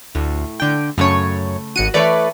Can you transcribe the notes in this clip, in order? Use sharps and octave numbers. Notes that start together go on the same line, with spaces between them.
D2 A2
D3 G5
F#2 C#3 A3 C#5
G#1 F#4 C#7 D#7
E3 A3 B4 C#5 D5